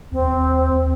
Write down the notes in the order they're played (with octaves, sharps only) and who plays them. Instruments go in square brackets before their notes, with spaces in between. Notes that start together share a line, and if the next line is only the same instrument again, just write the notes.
[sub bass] D#2 [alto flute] C4